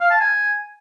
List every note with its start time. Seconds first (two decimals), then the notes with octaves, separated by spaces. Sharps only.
0.01 F5
0.11 A5
0.21 G#5